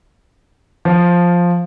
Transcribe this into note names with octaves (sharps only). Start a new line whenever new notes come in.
F3